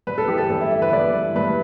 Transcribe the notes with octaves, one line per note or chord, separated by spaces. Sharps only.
G2 B4
A4
E3 G4
A4
G2 A4
E4
E3 E4
B4
G2 D5
E3
G2 B4